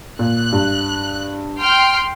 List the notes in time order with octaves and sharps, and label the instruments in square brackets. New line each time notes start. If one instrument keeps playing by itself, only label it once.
[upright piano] A#2 [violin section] F#6
[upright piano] G2
[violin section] G5 C6 F6